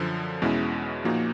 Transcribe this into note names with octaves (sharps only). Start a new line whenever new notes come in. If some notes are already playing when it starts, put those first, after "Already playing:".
Already playing: F#2 D3 F3
E2 B2 G#3 C#4 E4
A#2 F3 A#3 D#4 F#4